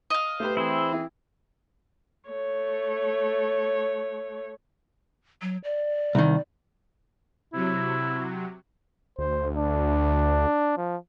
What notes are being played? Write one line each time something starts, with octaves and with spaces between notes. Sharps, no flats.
D#5 F5
A3 G4 B4 C5
E3 C4 E4 G#4 C5
E4
A3 C#5
F#3
D5
C2 D#3
C3 F#3 E4
D2 C5
D4
F3